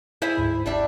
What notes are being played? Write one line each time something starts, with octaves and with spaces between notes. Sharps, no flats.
E4 G#4 C5 E5
D2 G#2 B5
G1 G3 D4 E5